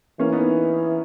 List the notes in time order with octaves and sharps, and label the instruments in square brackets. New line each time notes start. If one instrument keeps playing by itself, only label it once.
[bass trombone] E3 [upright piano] A#3 C#4
[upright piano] B3 D#4